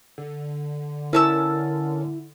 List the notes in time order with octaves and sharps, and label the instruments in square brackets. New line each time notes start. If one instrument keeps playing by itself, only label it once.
[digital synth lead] D3
[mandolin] C#4 A5 E6 [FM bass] E4 [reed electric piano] A#4